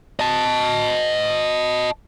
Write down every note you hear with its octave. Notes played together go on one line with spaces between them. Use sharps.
D#5 A5